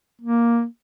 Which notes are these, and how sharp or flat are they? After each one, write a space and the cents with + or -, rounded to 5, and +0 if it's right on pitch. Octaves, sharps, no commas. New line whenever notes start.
A#3 +5